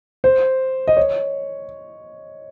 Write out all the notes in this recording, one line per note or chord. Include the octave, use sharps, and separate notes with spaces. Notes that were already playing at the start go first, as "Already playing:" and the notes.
C5
D#5
C#5